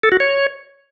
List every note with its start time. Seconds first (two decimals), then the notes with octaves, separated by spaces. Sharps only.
0.03 A4
0.12 F#4
0.20 C#5